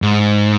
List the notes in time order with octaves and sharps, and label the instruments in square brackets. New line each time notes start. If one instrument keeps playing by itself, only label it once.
[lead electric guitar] G#2